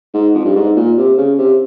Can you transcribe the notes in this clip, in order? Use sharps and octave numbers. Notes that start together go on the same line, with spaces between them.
G#2
F2
G2
G#2
A#2
C3
C#3
C3